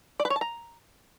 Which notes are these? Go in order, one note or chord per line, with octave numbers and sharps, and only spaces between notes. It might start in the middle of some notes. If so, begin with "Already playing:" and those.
D5
B4
C#5
A5
A#5